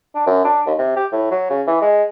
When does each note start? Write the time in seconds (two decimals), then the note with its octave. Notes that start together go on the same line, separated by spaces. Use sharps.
0.15 D4
0.26 F#2
0.44 D4
0.66 D#2
0.78 C3
0.96 G4
1.12 A2
1.31 F#3
1.50 C#3
1.67 E3
1.81 G#3